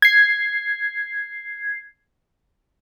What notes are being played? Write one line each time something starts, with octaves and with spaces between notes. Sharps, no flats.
G#6 C7